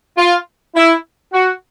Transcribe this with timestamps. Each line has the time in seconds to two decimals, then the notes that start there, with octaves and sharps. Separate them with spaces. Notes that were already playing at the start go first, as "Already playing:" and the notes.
0.17 F4
0.75 E4
1.32 F#4